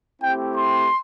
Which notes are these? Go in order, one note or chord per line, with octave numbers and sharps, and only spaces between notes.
A3 C4 E4 G4 G5
C6